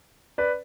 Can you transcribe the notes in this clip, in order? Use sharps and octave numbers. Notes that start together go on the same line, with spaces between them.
B4 D5